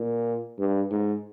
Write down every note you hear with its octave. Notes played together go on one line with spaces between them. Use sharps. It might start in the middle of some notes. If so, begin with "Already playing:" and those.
Already playing: A#2
G2
G#2